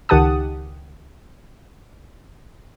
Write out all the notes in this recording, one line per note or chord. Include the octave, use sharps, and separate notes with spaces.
C#2 D#3 G4 F#5 A5 D#6